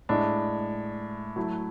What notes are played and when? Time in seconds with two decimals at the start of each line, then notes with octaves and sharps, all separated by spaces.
0.09 A2 G#3 D4
1.36 F#3 A3 E4